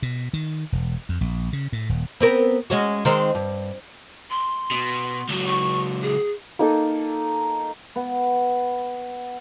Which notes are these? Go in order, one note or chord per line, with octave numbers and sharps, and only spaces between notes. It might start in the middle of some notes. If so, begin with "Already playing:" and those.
B2
D#3
E1
F2
A#1
C#3
A2
D#1
B3 C4 A#4
G#3 C#4 F#4
D#3 G#3 C4
G2
C6
B2
C#2 F#3
C#6
G#4
A#3 D#4 A4
B3